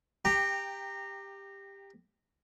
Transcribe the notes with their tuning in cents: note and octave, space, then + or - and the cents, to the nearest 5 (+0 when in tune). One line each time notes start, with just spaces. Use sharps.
G4 +15 G5 +0 A#5 -15